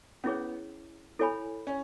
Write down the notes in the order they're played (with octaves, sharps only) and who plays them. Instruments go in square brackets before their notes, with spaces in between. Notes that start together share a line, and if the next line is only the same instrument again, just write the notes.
[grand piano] B3 [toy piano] C#4 E4 G#4 C#5
[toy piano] E4 A4 C#5 G#5 B5
[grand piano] C#4